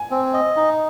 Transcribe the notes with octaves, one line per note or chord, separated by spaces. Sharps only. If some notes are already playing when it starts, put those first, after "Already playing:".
Already playing: G#5
C4
D#5
D#4